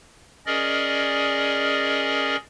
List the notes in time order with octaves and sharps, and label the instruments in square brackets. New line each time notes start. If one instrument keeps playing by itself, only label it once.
[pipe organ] C#4 G#4 A#4 D5 D#5